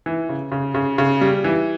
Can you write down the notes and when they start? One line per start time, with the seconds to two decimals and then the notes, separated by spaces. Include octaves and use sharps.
0.06 E3
0.29 C#3
0.52 C#3
0.75 C#3
0.98 C#3
1.21 G3
1.44 E3